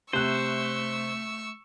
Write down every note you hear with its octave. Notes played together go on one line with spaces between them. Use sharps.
C3 A3 C5 C#6 E6 F#6